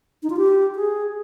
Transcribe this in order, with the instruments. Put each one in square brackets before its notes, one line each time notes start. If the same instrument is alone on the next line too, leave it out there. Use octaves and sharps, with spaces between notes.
[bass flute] D#4
F4
G4
G#4